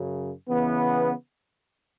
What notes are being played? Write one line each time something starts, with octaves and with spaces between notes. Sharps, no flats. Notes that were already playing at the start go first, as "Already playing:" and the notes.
Already playing: F#2 C#3 F#3
C#3 E3 B3